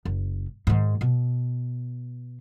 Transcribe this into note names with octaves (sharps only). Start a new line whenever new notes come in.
F#1
G#2 D#3
B2